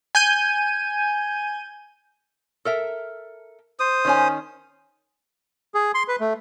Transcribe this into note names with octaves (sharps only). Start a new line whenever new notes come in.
G#5 G6 D#7
A4 A#4 E5
C5 D#6
D#3 C#4 G#5
G#4
C6
B4
A3